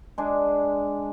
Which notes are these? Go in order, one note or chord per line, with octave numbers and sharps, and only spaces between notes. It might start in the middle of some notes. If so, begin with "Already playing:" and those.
G#3 D4